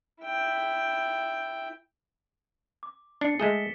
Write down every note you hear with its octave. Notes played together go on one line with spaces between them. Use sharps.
E4 G5
D6
D4 A6 C7 C#7
G#3 A3 G#4 B6 E7 G7